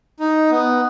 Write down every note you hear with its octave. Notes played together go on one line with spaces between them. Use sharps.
D#4
B3